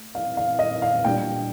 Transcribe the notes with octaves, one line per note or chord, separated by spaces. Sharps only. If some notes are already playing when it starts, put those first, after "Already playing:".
Already playing: A3
F5
F5
D#5
F5
A#2 G3 D4 G5